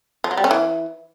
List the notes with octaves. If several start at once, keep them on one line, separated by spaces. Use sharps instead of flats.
F3
F#3
G3
C#4
E3